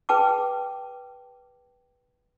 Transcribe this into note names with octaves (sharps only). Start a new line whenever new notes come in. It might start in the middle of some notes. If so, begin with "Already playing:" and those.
G#4 B4 G5 A5 D6